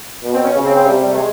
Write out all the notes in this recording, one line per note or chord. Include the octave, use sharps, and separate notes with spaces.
B2
C4
C#4
C#3 C#4
C4
C4
C3 G3
G3
A3
G#3